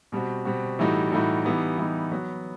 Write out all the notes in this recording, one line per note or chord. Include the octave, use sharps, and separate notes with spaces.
B2 G3 C4 F#4
B2 G3 C4 F#4
A2 E3 G3 D#4 F#4
A2 E3 G3 D#4 F#4
E3 G3 B3 D#4
E3 G3 B3 D#4
F#3 B3 F#4